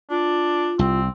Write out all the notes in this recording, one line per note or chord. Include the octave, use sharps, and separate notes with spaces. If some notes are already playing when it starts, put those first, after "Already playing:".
D4 F4
C2 C4